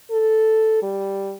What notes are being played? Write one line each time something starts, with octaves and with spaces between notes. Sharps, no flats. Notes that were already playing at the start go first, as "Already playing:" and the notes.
A4
G3